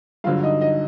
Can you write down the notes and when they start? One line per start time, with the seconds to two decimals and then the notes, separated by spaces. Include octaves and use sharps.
0.24 G2 D3 F#3 F4 F5
0.43 D#4 D#5
0.61 D#4 D#5